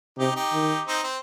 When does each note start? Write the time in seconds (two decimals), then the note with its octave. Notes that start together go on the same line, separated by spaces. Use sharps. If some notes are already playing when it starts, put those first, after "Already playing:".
0.18 C3 D#4 G4
0.36 D#4 G4
0.53 D#3
0.87 C4 D#4
1.03 C4